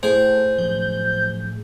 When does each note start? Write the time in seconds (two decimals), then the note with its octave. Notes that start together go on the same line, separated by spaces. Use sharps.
0.03 A2 G#4 C5
0.58 A2 F3 F#3 G6